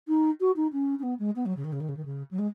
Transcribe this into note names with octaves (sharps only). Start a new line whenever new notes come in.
D#4
F#4
D#4
C#4
C#4
B3
G#3
B3
F#3
C#3
D#3
C#3
D#3
C#3
D#3
C#3
F#3
G#3